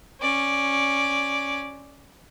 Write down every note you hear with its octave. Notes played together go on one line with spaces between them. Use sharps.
C#4 D5